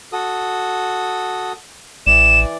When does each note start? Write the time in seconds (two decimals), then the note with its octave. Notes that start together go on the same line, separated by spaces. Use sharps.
0.13 F#4 A4 D#6
2.07 A1 E3 D5 E7